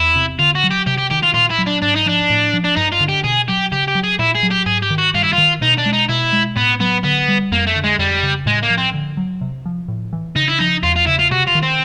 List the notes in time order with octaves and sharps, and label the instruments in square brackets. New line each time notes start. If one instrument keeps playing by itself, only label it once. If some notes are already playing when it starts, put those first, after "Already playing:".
Already playing: [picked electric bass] E2 [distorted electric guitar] E4
[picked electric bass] C3
[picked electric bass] D3 [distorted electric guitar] F4
[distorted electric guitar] F#4
[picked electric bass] F#3
[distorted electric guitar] G4
[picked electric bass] C3 [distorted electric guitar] G4
[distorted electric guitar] G4
[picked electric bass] D#3 [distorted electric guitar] G4
[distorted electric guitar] F4
[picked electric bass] A#2 [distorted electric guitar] F4
[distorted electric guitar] E4
[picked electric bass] F#3
[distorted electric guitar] D4
[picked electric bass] G#2 [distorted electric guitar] D4
[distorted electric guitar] D#4
[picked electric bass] F3 [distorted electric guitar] D4
[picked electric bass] A2
F3
[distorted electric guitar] D4
[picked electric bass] G2 [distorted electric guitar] D#4
[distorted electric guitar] F4
[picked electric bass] D3
[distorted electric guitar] G4
[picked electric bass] B2 [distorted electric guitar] G#4
[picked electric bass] F#3 [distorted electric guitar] G4
[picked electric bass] C#3 [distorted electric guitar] G4
[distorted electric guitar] G4
[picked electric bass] F#3
[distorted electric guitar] G#4
[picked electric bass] A#2 [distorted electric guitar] E4
[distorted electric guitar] G#4
[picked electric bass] F#3
[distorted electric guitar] G4
[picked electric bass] G#2 [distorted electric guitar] G#4
[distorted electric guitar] G4
[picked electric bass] D#3
[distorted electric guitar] F#4
[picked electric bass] G2 [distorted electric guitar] F4
[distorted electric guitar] E4
F4
[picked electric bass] D#3
[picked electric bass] B2 [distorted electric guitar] D#4
[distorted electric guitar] D4
[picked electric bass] G#3
[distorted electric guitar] D#4
[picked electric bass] B2 [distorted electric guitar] E4
[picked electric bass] G#3
[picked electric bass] A2 [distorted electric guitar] B3
[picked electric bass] F#3 [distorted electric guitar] B3
[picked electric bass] D3 [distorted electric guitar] B3
[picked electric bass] G3
[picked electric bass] F2 [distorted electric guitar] A#3
[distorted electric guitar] A3
[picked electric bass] D3
[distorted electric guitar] G#3
[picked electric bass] F2 [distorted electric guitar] G3
[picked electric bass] C#3
[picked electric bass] A2 [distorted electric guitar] G#3
[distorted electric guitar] A#3
[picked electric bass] F3
[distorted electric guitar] C4
[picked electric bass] D3
F#3
C3
F3
A2
E3
[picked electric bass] C#3 [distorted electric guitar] D#4
[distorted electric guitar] E4
[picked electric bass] F3 [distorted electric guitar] D#4
[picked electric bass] E2 [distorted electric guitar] F4
[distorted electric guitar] F4
[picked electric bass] C#3 [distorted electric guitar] E4
[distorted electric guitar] F4
[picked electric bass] C3 [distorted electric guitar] F#4
[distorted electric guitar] F4
[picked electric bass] D#3
[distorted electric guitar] C4